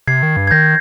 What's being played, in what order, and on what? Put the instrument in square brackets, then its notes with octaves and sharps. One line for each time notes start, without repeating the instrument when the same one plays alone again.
[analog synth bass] C3 [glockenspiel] G#6 C7
[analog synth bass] D#3
G2
[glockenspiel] G#6
[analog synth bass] D#3 [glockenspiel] G6 A#6